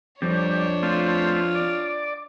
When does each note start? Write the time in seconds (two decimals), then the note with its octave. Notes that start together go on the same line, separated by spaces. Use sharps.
0.22 F2 G3 D4 C#5
0.83 A3 C4 F4
1.55 D5